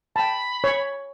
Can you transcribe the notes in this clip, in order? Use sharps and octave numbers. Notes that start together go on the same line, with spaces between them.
G5 A5 B5
C#5